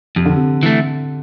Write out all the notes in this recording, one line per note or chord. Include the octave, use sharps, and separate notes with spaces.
F2 C3
D3
C3
E3 A3